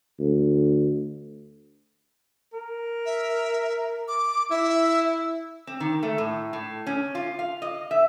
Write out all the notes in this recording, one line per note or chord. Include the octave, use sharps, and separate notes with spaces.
D2
A#4
E5
D6
E4 E5
C4
D#3
A3
A2
A2
C#4
F4
F5
D#5
E5